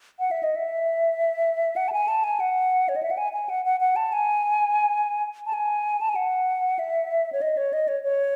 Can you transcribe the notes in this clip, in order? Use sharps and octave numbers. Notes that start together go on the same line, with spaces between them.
F#5
E5
D#5
E5
F#5
A5
G#5
A5
G#5
F#5
C#5
D#5
E5
F#5
G#5
G#5
F#5
F#5
F#5
A5
G#5
A5
G#5
A5
G#5
F#5
E5
C#5
D#5
C#5
D#5
C#5
C#5